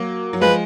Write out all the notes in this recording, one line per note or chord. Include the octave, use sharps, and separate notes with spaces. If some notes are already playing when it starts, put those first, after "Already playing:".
Already playing: F#3 A#3
F#3
F3 G#3 B4